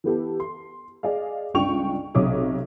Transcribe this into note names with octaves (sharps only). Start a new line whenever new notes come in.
E3 B3 G4 A4
C6
G#4 D5 D#5 F5
G1 C#2 D4 G5 C#6 F7
B1 C3 C#5 D6 D#6